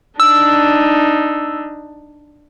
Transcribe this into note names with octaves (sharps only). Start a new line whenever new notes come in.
D4 D#4 E6